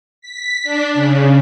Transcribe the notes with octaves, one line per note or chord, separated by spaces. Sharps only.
B6
D4
C#3